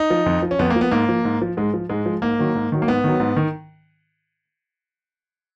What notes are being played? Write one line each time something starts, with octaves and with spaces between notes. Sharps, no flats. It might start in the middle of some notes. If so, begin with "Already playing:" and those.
Already playing: D#4
F3
F2
F3
C#4
F2 B3
A#3
F3
B3
G#2 A#3
F3
G#2
F3
G#2 G#3
F3
G#2 G#3
F3
G#2 A#3
D#3 F#3
G#2
D#3 F#3
A#3
G#2 B3
D#3 F#3
G#2
D#3